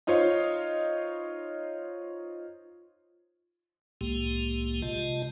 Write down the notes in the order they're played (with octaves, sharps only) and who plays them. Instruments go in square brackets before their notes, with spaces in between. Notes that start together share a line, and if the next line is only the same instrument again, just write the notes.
[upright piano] D#4 F4 C5 C#5 F5
[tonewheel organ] C2 A2 G#3 A#3 G4
C3 G#3 F4 D#5 A5